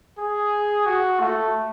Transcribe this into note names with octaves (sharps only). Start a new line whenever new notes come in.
G#4
F#4
A3